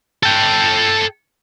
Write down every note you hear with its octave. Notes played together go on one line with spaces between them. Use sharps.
A4 G5